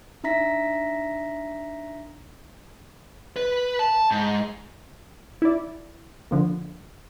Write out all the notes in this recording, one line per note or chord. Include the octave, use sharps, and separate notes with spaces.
D4 D#4 E5 A#5 A#6 B6
B4
A5
G#2
E4 D5
D3 F3 A#3